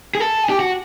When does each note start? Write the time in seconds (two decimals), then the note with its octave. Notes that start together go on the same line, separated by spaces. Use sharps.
0.15 G#4
0.20 A4
0.44 G#4
0.50 G4
0.60 F#4